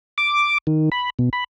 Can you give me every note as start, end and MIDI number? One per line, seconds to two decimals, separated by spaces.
0.18 0.58 86
0.67 0.89 51
0.92 1.10 83
1.19 1.29 47
1.33 1.44 83